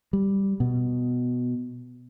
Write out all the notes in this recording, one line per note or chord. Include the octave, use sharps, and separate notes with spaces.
G3
B2